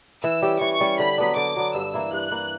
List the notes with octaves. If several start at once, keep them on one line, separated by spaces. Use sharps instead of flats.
E3 E6
G3 C#4 G4
E3 C#6
G3 C#4 G4
D3 B5
F#3 B3 D4
D3 D6
F#3 B3 D4
G2 E6
E3 A#3 E4
G2 F#6
E3 A#3 E4